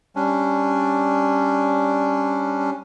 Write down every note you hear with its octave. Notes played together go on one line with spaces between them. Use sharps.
G3 C#4 D4